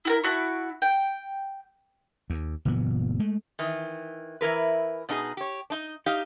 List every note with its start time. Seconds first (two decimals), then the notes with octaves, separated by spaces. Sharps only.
0.05 E4 F#4 A#4
0.23 E4 F#4 A5 C#6
0.82 G5
2.30 D#2
2.65 F#1 A#2 E3 B3
3.19 G#3 A3
3.59 D#3 E3
4.41 E3 E4 A#4 B4
5.09 B2 D4 D#4 G#4 B4
5.37 G4 C#5
5.70 D4 D#4 D#5
6.06 D#4 G4 F5